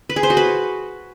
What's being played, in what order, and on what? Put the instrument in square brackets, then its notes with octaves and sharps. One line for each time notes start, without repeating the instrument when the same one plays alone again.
[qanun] B4
G#4
C5
F#4
B4